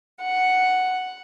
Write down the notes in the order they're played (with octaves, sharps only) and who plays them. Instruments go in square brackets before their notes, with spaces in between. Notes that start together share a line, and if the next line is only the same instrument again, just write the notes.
[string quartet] F#5